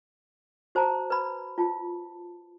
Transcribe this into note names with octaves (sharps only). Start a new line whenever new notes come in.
F#4 C5 A5 A#5
B4 B5
F4 A5